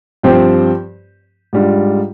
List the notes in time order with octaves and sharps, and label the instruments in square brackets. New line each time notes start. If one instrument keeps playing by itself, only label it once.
[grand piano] G2 F3 C4 G4 C5
G#2 G3 D4 F4